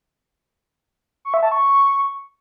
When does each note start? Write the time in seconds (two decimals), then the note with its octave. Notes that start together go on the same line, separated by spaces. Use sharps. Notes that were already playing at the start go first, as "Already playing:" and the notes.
1.25 C#6
1.34 E5
1.43 A5
1.52 C#6